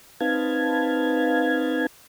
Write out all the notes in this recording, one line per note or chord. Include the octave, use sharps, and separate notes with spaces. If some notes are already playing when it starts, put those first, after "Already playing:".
C4 D#4 B4 F5 A5 G#6